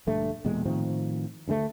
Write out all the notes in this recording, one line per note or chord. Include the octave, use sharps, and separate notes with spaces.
A#1 G2 D3 A3
E1 E2 A#2 G#3
A2 D#3 F3 C4
D2 D3 G3 A3